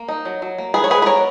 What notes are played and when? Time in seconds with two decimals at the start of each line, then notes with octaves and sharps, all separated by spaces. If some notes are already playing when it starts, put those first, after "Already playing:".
Already playing: A#3
0.09 D#4
0.25 F#3
0.42 F#3
0.58 A#3
0.74 D#3 G#4 B4
0.84 C#5
0.90 G#3 G#4 B4
1.02 B4
1.06 B3 A#4 C#5